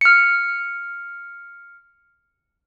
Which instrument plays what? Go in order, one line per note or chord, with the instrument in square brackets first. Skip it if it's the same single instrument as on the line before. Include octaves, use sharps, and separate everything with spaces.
[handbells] F6 C#7